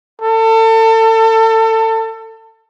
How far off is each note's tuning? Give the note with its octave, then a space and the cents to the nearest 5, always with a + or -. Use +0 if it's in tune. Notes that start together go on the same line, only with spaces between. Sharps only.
A4 +30